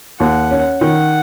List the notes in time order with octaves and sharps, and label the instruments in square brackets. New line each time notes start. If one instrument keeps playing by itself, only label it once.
[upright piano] D#2 [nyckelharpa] F#5
[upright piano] C#4
[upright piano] D#3 [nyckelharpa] F#5